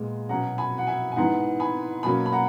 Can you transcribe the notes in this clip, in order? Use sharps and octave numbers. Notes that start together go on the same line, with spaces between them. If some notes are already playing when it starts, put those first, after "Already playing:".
Already playing: A#2 G#3 B3
B2 F#3 C#4 F#5 A#5
G#5 B5
F#5
E5 G#5
G#5
G#2 E3 B3 F#5 A#5
G#5 B5
B2 F#3 A#3 C#4 G#5 B5
B5
F#5 A#5